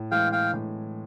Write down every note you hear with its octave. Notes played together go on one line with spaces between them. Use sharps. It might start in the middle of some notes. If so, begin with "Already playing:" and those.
Already playing: A2
E3 G#3 F5 G5
F5 G5
A2